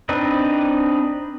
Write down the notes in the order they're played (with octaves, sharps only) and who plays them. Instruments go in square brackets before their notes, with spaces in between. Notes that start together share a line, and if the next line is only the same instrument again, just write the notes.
[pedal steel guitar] C4 D4 D#4 B4